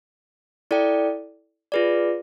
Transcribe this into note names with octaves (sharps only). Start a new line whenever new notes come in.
E4 A4 D5 G5
F4 G#4 B4 D5